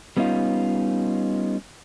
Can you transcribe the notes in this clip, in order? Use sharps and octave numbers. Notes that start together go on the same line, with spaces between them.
G3 B3 C#4 D#4 F4